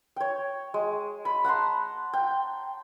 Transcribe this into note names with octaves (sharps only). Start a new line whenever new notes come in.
C#5 G5
G#3
B5
F#5 A5 A#5 C6
G5